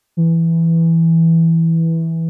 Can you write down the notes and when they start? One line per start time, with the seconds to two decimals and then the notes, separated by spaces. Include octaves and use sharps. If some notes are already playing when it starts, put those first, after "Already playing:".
0.17 E3